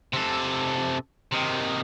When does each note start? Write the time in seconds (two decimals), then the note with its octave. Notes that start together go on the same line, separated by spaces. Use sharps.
0.13 C3 A4
1.32 C3 D#3